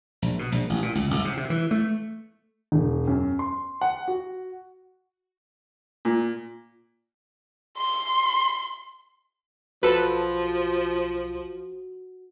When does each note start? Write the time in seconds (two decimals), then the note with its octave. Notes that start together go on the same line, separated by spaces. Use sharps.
0.22 A#1
0.39 B2
0.52 A#1
0.69 A1
0.82 A#2
0.95 C#2
1.11 C2
1.25 C3
1.37 C3
1.50 E3
1.71 A3
2.72 E1
3.07 F#2
3.39 C6
3.81 F#5
4.08 F#4
6.05 A#2
7.78 C6
9.83 B1 F3 F#4 A4 B4